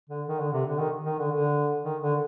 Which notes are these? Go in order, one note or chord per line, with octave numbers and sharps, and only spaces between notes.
D3
D#3
D3
C3
D3
D#3
D#3
D3
D3
D#3
D3